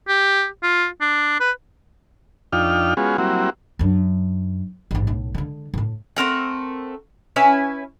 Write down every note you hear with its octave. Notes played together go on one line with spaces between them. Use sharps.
G4
F4
D4
B4
F2 D4 D#4 F4 G5 F6
G#3 B3 C#4 F4 F#4 G#4
F#3 G3 A#3 C4 E4 F#4
F#2 D4
A1 G#2
B1 A2
D3 G#3
A1 A2
A3 C4 A#4 F#5
C#4 E4 B4 G#5